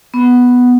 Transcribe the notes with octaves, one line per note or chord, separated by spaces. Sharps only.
B3